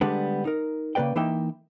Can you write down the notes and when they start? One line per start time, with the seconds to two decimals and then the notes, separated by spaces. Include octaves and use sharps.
0.01 D3 G3 G#3 B3 D4
0.45 D#4 A#4
0.95 C#3 A#3 B4 D5 G5
1.16 E3 A#3 D#4 E5 G5